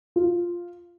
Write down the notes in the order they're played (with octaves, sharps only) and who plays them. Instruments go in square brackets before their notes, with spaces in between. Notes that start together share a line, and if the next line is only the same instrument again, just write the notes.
[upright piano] F4